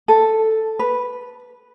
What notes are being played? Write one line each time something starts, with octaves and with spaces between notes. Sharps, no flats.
A4
B4